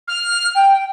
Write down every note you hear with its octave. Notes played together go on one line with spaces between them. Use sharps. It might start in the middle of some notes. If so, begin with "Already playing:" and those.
F6
G5